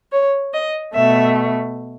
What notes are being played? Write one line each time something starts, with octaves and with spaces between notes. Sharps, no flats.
C#5
D#5
B2 A3 E5